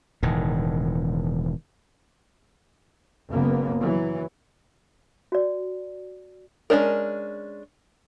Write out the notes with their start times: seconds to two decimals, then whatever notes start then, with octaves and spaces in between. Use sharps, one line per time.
0.23 E1 A2 D#3
3.31 F#1 C#3 A#3 B3
3.81 E3 F#3
5.32 F#4 D5
6.70 G#3 A#3 C#4 D4 A#4